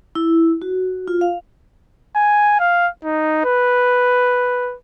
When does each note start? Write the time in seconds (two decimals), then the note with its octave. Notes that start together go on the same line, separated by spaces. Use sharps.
0.15 E4
0.62 F#4
1.08 F4
1.21 F5
2.16 G#5
2.59 F5
3.04 D#4
3.45 B4